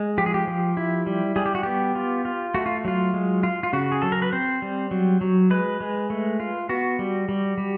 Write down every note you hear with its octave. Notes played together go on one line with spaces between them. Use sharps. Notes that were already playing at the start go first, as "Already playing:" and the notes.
Already playing: G#3
F3 G4
G#4
G4
F3
E4
G3
G3 G#4
G4
F#4
B3 G4
F4
F4
A3 F#4
F4
F#3 F4
G#3
F4
F4
C#3 F#4
G#4
F#3 A4
A#4
B4
C4 C5
G3
F#3
F#3
G#3 B4
G#3
A3
F4
B3 F#4
G3
G3
G3